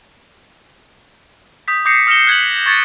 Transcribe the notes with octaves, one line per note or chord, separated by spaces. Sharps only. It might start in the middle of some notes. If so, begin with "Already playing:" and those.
D#6 G6 B6
D6 D#6 G6 A#6 C7 C#7
D#6 F6 A#6 C#7 E7 G7
F#6 G#6 C7 F#7
C#6 G#6 A6 C#7